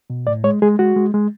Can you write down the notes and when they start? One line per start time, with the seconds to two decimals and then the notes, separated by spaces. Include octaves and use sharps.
0.10 B2
0.27 A2 D5
0.44 G#3 C#5
0.62 G#3 G#4
0.79 G#3 F#4
0.96 G#3
1.14 G#3